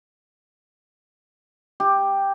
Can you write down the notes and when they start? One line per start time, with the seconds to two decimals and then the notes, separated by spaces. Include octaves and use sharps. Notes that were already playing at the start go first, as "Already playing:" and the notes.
1.80 G4